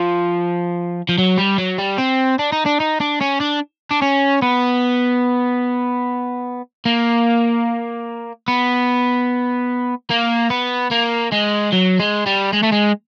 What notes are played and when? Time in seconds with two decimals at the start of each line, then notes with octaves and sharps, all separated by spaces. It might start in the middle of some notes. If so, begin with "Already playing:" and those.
Already playing: F3
1.09 F3
1.18 F#3
1.38 G3
1.58 F#3
1.79 G3
1.98 C4
2.39 D4
2.52 D#4
2.66 D4
2.80 D#4
3.00 D4
3.21 C#4
3.40 D4
3.91 D4
4.02 C#4
4.42 B3
6.85 A#3
8.48 B3
10.10 A#3
10.50 B3
10.91 A#3
11.32 G#3
11.72 F#3
11.99 G#3
12.26 G3
12.53 G#3
12.63 A3
12.72 G#3